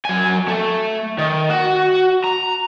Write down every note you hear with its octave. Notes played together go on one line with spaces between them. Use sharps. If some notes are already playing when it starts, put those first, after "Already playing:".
F#3 G#5
A3
D#3
F#4
A#5